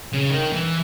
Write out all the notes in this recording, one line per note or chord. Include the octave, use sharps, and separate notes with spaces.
C#3
D#3
E3